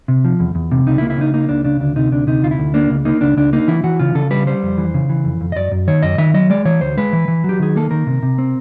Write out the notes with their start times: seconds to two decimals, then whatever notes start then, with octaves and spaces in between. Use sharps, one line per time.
0.08 C3
0.24 F3
0.40 E2
0.55 E2
0.71 C3
0.86 C#2 D#4
0.98 E4
1.02 A#3
1.10 E4
1.18 C#3 D#4
1.34 A#3 D#4
1.49 C#2 D4
1.64 C#3 D4
1.80 D2 D4
1.96 C3 D#4
2.11 D2 D4
2.27 C3 D#4
2.42 D2 F4
2.51 E4
2.58 D2
2.74 A#3 D4
2.90 C#2
3.05 A#3 D#4
3.21 C#2 D4
3.37 C#2 D4
3.53 A#3 D#4
3.68 E3 E4
3.84 E3 F#4
3.99 C#3 F4
4.15 C#3 A4
4.31 G3 B4
4.47 G3 C5
4.63 F2
4.78 E3
4.94 C#3
5.09 E3
5.25 F2
5.41 F2
5.52 D#5
5.56 F#2 D5
5.71 F#2
5.87 D#3 C#5
6.03 F#2 D#5
6.18 D#3 E5
6.34 F#3 D#5
6.50 G#3 D5
6.65 E3 C#5
6.81 D2 C5
6.98 G#3 B4
7.13 E3
7.28 E3
7.44 F#3
7.49 G4
7.60 D#3 G#4
7.76 A#3 A4
7.91 D#3 A#4
8.07 C3
8.23 C3
8.38 C4